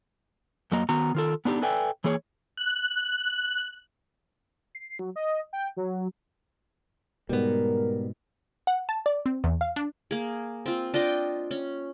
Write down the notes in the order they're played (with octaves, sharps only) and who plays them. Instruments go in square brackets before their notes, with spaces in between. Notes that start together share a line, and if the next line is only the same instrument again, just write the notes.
[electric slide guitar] F#2 F#3 A#3 D#5 A#5
D#3 B3 F#4 A#5
D#3 F4 A4
B3 D4 D#4 G4
A4 B4 D5 E5 G5 G#5
E3 A#3 G#4 C#5
[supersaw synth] F#6
[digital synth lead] C7
F#3
D#5
G5
F#3
[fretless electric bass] G#2 B2 [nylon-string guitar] G3 B3 [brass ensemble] A#4
[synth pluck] F#5
A5
D5
C4
E2
F5
D4
[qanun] A#3 G#4
C4 F4
D4 F4 D#5 G5
C#4